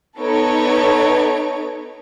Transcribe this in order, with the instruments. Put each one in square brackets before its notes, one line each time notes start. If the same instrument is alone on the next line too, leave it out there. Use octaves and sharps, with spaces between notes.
[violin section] B3 D#4 A4 B4 C#5 D7